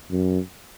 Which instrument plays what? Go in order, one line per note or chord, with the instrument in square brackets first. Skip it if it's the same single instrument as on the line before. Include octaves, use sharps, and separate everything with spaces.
[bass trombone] F#2